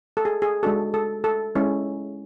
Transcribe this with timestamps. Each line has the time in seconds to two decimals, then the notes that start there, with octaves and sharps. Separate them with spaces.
0.17 A4
0.25 G#4
0.42 G#4
0.63 G#3 D4 F#4 A4
0.94 A4
1.24 A4
1.55 G#3 C#4 E4